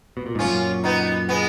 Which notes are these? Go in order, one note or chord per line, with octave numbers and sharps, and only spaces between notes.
B2
A#2
G#2 C#4 F4
F#2 A#2
B3 D#4
G#3 B3